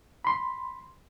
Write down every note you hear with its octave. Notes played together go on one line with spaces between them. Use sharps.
B5 C6